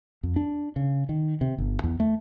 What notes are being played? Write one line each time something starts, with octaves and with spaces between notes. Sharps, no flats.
F2
D4
C#3
D#3
C3
G1
E2
A3